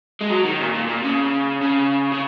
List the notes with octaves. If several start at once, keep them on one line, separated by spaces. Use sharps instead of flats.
G#3
F#3
D#3
A#2
A#2
A#2
C#3
C#3
C#3